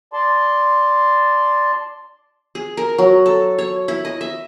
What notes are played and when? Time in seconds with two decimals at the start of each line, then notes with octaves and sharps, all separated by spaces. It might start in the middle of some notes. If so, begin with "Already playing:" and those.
0.13 D5 A5 C6
2.55 G#4
2.77 A#4
2.98 F#3
3.26 A4
3.58 C#5
3.88 E4
4.05 D#5
4.21 E5